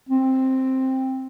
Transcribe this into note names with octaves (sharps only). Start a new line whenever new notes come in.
C4